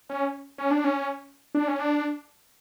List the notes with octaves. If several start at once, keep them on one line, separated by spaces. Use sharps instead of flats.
C#4
C#4
D4
C#4
D4
C#4
D4